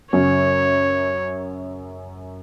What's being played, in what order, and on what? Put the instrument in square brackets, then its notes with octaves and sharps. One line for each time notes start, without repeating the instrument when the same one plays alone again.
[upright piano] F#2 C#3 F#3 C#4 [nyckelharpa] C#5